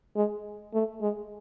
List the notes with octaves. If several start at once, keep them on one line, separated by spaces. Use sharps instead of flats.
G#3
A3
G#3